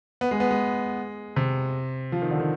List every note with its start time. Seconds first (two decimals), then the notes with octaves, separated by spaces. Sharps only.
0.21 B3
0.31 G#3
0.40 B3
0.51 G#3
1.36 C3
2.12 F3
2.22 D#3
2.31 D3
2.40 D#3